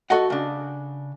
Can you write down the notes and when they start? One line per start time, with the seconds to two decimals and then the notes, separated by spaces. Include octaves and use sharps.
0.10 F#4 A4 D#5 F#5
0.30 C#3 D4